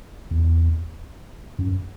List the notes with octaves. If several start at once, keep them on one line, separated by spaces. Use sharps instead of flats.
E2
F#2